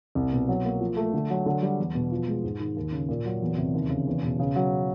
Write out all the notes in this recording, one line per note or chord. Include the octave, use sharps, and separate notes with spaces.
C2
B2
F#3
A#3
F3
A3
D3
F#3
D3
G3
E2
B2
F3
G#3
G#2
D#3
D#2
C#3
A#2
F#3
E2
C3
D#2
C#3
E2
B2
C#3
F#3